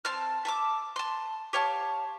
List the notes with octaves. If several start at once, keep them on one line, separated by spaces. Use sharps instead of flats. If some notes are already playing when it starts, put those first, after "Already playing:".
C4 A5 F6
E5 A5 D6
A5 C6
G4 C#5 F5 A5